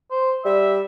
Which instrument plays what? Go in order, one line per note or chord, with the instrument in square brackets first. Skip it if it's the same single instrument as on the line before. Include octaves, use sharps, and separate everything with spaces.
[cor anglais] C5
[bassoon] G3 [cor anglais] E5